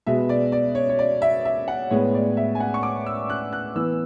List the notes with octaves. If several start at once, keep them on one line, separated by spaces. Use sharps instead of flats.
B2 G#3 B3 E5
D5
D5
C#5
C#5
D5
E5
E5
F#5
A2 G#3 B3 C#5
D5
E5
G#5
F#5
C#6
D6
E6
F#6
F#6
E3 B3 E6